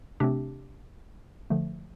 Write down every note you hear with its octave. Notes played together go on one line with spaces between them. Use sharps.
C3 A3 C4 D4 G4
D3 F3 A3